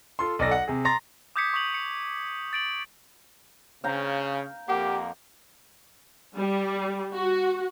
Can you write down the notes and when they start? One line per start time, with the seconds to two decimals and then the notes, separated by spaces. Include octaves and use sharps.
0.19 F4 A4 C6
0.39 B1 A4 D5 A#6
0.51 F#5
0.68 C3 G#4
0.85 A#5 C6 A6 A#6
1.36 D6 D#6 G6 G#6 B6 C#7
1.53 C#6 D#6 G6 B6 F7 F#7
1.74 C#7
2.53 A6 D7 F#7
3.84 C#3 F5 G5 A#5
4.68 F2 A#3 G4 F#5 D6
6.37 G3
7.14 F#4